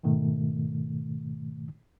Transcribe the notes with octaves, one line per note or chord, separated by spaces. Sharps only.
G#2 B2 D#3 A3